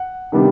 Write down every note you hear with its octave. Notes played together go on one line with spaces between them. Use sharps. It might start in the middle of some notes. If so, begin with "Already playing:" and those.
Already playing: F#5
C3 D#3 G3 B3 D4